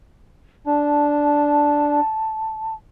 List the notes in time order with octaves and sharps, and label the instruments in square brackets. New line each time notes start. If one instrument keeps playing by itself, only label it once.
[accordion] D4 [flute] A5